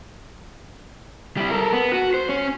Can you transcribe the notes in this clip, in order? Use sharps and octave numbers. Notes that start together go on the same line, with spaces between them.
G3 E4
A4 A#4
B3
F#4
C5
C#4 C#5